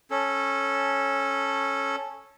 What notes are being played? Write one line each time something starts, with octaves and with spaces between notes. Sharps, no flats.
C#4 A4